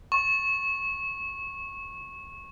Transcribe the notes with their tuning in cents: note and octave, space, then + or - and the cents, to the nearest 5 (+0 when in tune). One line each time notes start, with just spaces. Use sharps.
C#6 -20